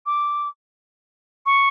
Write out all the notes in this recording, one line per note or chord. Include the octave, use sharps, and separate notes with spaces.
D6
C#6